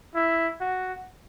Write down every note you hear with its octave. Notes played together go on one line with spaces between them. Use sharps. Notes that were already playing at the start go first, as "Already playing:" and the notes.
E4
F#4